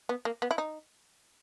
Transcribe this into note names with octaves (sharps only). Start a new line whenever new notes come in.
B3
A#3
B3
E4
D#4